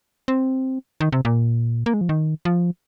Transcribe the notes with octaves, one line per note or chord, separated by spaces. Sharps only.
C4
D#3
C3
A#2
A#3
G#3
F3
D#3
F3